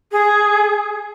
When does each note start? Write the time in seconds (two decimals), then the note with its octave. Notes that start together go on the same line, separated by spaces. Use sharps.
0.12 G#4